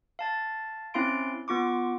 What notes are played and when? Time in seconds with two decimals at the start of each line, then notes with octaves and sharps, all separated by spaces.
0.19 F5 A5 A6
0.94 C4 C#4 E4 F5 C6 D7
1.48 B3 F4 C#6 D6